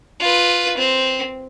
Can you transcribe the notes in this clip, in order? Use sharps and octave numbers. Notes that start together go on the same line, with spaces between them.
F4 B4
C4